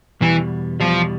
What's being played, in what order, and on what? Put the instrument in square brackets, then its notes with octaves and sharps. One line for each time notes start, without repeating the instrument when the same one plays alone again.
[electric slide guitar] E2 B2 G3 [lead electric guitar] E3
[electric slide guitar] E2 B2 G3 [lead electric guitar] F3